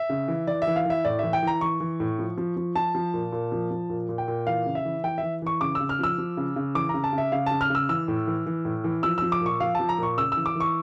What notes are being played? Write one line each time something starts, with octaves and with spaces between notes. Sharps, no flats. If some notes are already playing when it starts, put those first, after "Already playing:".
Already playing: E5
C#3
E3
E3 D5
E5
E3
F5
E3 E5
A2 D5
E3 E5
G5
E3 A#5
E3 C#6
E3
A2
F3
F3
F3
F3 A5
F3
A#2
A#2
F3
F3
A#2
A#2
G5
A#2
E3 F5
C#3
E5
E3
E3 G5
E3 E5
E3 C#6
C#3 D6
E6
C#3
F6
F3 E6
F3
C#3
C#3
E3 D6
C#3 A#5
A5
C#3
E5
C#3 F5
C#3 A5
F6
C#3 E6
E3 E6
A2
E3
E3
A2
E3
F3 E6
F3 E6
D6
A#2 C#6
F3 F5
F3 A5
A#5
A#2 C#6
C#3 E6
E3 E6
D6
E3 C#6